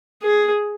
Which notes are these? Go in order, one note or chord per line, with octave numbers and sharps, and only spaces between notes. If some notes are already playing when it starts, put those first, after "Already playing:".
G#4